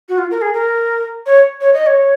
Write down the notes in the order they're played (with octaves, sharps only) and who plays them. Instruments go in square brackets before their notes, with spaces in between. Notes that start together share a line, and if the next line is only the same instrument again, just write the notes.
[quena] F#4
F4
A#4
G#4
A#4
C#5
C#5
D#5
C#5